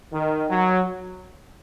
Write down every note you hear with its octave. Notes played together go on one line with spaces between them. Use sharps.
D#3
F#3